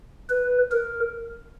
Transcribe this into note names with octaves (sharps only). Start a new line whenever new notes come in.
B4
A#4